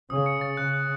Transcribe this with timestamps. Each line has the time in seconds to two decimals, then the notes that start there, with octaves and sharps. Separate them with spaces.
0.10 C#3 D#6
0.26 C#7
0.41 A6
0.57 C#3 F#6
0.73 F#6